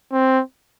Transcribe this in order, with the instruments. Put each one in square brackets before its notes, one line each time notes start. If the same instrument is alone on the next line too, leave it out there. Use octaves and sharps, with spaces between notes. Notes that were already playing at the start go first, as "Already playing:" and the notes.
[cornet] C4